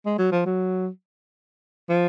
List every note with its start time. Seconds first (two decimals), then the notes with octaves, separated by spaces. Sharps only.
0.06 G#3
0.19 F#3
0.32 F3
0.46 F#3
1.89 F3